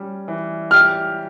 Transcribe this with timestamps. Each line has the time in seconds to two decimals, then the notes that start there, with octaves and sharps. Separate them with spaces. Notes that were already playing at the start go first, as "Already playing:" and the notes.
Already playing: G3 C#4
0.28 E3
0.71 G4 F6